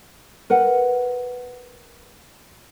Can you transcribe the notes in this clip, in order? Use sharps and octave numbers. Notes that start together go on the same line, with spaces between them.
A#4 B4 F#5